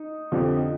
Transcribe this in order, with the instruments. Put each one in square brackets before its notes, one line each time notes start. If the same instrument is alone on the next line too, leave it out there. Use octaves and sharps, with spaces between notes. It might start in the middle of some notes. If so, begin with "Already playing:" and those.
Already playing: [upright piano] D#4
[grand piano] F2 D3 F3 C4 G4